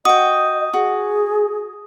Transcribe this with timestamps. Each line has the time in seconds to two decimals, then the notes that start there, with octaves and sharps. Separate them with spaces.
0.05 F#4 D#5 G5 D#6
0.74 F#4 G#4